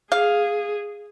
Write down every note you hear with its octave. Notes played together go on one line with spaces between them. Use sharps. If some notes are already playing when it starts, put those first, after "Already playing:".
G#4 F5